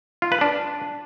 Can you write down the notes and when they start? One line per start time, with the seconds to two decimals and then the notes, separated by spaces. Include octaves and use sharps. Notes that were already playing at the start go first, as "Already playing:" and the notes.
0.22 F4
0.32 B4
0.41 D4